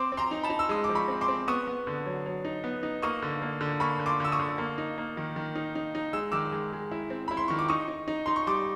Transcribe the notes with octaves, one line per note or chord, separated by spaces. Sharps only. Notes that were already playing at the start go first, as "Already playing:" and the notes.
Already playing: C4 C6 D6
C4
A#5 C6
D#4
A5 B5
D#4
E6
G#3 D#6
F3 D6
B5 C#6
C4
C6 D6
C4
B3 C#6 D#6
B3
D3
F#3
F#3
D#4
B3
D#4
A#3 C#6 D#6
D3
A#3
D3
A#3 B5 C#6
D3
C6 D6
D3 E6
C#6 D#6
D3
A#3
D#4
A#3
D#3
D#3
D#4
D#4
D#4
G#3 E6
D#3 D6 E6
G#3
G#3
E4
C4
E4 B5
C6
D#3 C#6
D6
D#4 C#6 D#6
D#4
D#4
D#4 C6
C#6
G3 C6 D6